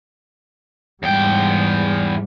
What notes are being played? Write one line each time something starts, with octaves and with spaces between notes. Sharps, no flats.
E2 G#2 G3 G5